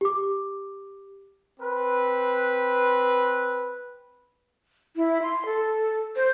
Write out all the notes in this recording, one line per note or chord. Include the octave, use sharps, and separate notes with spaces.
G4 D6
C4 B4
E4
C6
A4
C5